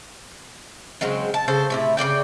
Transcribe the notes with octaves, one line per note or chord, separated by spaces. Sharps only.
C#3 F#3 G#3 C4
A5
C#3 A4 C5
A2 C3 E4
C#3 G#3 D5 G5